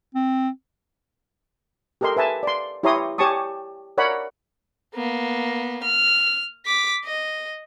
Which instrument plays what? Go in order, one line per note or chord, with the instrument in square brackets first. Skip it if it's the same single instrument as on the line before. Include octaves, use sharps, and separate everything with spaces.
[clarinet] C4
[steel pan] G4 A4 A#4 D#5 C6
B4 E5 G#5 A5
D5 C6
E4 G4 C#5 A#5 C6 D#6
G4 C#5 G#5 A5 C#6 D#6
A#4 C#5 D5 F#5 B5
[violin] A#3 B3
F6
D6 B6
D#5